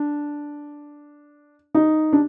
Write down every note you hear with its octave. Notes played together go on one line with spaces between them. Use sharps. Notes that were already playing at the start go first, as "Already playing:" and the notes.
Already playing: D4
D#4
D4